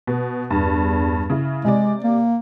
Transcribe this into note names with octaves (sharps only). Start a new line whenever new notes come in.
B2
E2 G2
C#3 E4
C3 G#3 D5
A#3